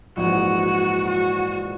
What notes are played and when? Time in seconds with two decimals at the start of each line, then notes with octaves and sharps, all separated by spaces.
0.17 A#1 G#2 E3 F#4
1.07 F#4